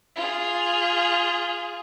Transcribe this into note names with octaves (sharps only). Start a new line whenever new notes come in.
F4 G#4